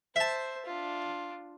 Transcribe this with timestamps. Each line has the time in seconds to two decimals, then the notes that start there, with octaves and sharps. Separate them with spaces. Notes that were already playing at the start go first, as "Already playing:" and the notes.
0.16 C5 E5 A5
0.66 D4 F4